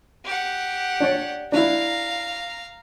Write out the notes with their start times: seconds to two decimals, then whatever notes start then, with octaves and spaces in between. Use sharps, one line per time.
0.25 G4 F#5
1.00 D4 C#5 D5
1.52 D4 E4 F5 A#5